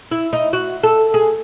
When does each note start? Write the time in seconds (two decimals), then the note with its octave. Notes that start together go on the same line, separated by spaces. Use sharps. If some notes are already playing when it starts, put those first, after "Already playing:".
0.11 E4
0.33 D#4
0.53 F#4
0.83 A4
1.14 G#4